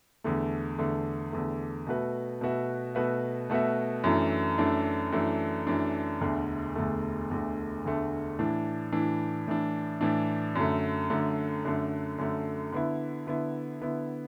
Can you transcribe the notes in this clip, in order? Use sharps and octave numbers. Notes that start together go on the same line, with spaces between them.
E2 D3 A3
E2 D3 A3
E2 D3 A3
B2 A3 F#4 B4 E5
B2 A3 F#4 B4 E5
B2 A3 F#4 B4 E5
B2 A3 F#4 B4 E5
F#2 E3 A3 D4
F#2 E3 A3 D4
F#2 E3 A3 D4
F#2 E3 A3 D4
E1 D2 D3 A3
E1 D2 D3 A3
E1 D2 D3 A3
E1 D2 D3 A3
A2 E3 D4
A2 E3 D4
A2 E3 D4
A2 E3 D4
F#2 D3 A3
F#2 D3 A3
F#2 D3 A3
F#2 D3 A3
D3 B3 E4
D3 B3 E4
D3 B3 E4